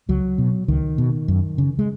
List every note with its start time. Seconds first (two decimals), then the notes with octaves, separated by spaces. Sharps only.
0.09 C#2 F#3
0.38 B2
0.68 C#2 D#3
0.98 B2
1.28 F#2
1.58 C#3
1.79 G#3